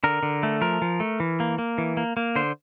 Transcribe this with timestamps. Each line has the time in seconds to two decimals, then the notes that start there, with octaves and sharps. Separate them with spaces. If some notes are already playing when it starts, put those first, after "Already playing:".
0.04 D3 A#4
0.23 D3
0.43 A3
0.61 F3 A#4
0.82 F3
1.00 A3
1.20 E3
1.40 A#3
1.58 A#3
1.78 E3
1.97 A#3
2.17 A#3
2.36 D3 C5